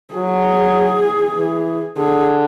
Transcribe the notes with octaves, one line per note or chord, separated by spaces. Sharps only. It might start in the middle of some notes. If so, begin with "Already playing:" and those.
F#3 G#4
E3
D3 G#4